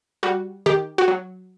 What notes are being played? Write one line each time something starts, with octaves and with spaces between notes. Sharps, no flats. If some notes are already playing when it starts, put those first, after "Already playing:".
G3 F#4
D#3 G4
F#4
F#3